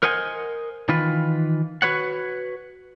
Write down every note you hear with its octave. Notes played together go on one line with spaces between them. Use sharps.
A#4 C5 D#5 F#5 G#5
D#3 E3 F4 B4
F#4 B4 C#5 F#5